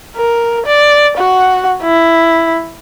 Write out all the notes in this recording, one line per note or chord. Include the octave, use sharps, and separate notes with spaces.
A#4
D5
F#4 F#5
E4